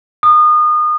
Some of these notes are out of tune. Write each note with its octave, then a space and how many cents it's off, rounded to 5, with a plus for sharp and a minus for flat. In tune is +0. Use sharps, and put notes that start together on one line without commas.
D#6 -30